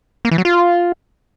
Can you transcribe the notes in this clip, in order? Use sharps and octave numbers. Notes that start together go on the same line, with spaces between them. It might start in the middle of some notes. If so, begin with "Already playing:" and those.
A#3
E3
F#3
F4